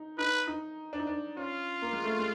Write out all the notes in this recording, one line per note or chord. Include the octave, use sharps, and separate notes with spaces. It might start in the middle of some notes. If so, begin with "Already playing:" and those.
Already playing: D#4
D#4 B4
D#4
D4
D#4
D4
C#4 F4
A#3
G#3
A3
G#3